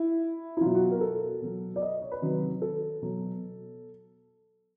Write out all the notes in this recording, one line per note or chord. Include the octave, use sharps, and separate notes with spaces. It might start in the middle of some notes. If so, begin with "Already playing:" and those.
Already playing: E4
E4
B2 F#3 F4
F#4
A#4
A4
B2 F#3
D5
D#5
C#5
B4
C3 D#3 F#3
A4
B2 F#3